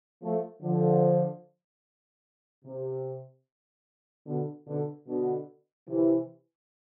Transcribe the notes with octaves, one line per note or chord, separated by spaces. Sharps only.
F3 A3
D3 F3
C3
B2 D3
B2 D3
B2 D3
C3 E3